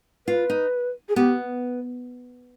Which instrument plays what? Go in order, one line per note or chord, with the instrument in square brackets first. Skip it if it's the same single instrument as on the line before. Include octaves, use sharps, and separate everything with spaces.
[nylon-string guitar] F4 [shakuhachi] B4
[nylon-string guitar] D#4
[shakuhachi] G#4
[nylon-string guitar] B3 [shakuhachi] G4